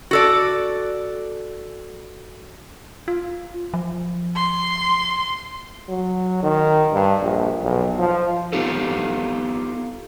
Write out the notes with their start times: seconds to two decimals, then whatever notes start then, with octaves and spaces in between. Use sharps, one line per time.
0.11 F#4 A4 D5
3.08 F4
3.74 F3
4.36 C6
5.89 F#3
6.43 D#3
6.93 G2
7.22 A#1
7.63 B1
7.99 F3
8.53 B3 D#4 F4 G4 A4